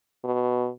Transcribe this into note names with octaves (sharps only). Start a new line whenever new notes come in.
B2